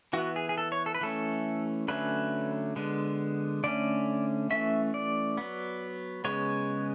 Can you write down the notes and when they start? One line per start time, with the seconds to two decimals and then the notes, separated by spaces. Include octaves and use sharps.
0.13 E3 B3 F#4
0.36 G#4
0.49 G#4
0.58 A4
0.72 C#5
0.86 A4
0.95 B4
1.01 E3 A3 C#4 A4
1.88 D3 F#3 A3 C#4 B4
2.76 D3 G#3 B3
3.64 D3 A3 C#4 D5
4.50 E3 A3 C#4 E5
4.94 D5
5.37 F#3 B3
6.24 C#3 G#3 B3 C#5